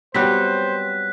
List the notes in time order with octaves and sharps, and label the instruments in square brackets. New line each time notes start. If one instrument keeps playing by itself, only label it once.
[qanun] F#3 B3 C#5 [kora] G3 C4 [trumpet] C5 [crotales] F#6 B6